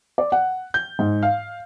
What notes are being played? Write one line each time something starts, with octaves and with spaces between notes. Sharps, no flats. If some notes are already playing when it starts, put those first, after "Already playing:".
D5
F#5
G6
G#2
F5